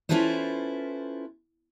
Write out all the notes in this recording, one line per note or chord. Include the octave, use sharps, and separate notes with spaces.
C#4 E4 F4 A4 B4 C5